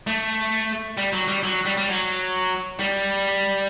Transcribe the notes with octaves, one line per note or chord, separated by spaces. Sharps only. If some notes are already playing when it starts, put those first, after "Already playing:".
A3
G3
F#3
G3
F#3
G3
G3
F#3
G3